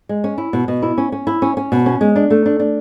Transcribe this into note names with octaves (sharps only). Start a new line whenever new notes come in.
G#3
C#4
E4
B2
B2
E4
C#4
C#4
E4
C#4
C#4
B2
C#4
G#3
D4
A3
D4
D4